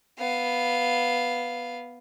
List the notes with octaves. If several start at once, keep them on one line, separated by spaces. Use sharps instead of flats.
B3 F5